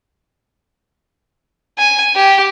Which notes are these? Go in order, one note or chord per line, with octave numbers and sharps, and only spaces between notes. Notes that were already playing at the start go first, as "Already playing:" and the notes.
G#5
G4